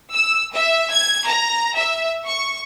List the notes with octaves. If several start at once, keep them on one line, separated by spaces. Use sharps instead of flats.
E6
E5
G#6
A#5
E5
C#6